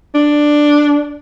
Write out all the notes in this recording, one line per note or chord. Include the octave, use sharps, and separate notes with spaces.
D4